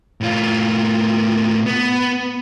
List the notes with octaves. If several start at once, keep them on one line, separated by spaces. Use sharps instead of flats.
A2 F4
B3